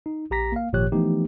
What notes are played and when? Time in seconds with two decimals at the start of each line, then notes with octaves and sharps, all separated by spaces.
0.06 D#4
0.31 A#1 G4 A#5 A#6 B6
0.52 A#3 F5
0.73 G#1 A#2 F3 G4 C#5 F#6
0.92 E3 F3 A3 B3 D#4 G4